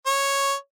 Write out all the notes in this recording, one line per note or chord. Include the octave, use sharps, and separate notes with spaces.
C#5